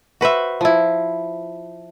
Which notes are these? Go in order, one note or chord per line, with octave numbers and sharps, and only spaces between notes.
F#4 B4 C5 E5
F3 E4